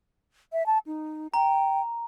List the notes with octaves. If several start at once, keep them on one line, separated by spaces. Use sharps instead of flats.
E5
A5
D#4
G5 A#5